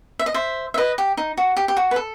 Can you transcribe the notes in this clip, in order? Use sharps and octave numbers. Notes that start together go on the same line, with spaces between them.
E5
D#5
C5 E5
E5
B4 D#5
G4
D#4
F#4
G4
G4
F#4
B4
A4